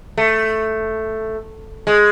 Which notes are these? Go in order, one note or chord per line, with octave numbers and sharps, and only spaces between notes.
A3
G#3